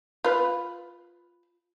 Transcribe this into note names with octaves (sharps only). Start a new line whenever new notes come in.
F4 B4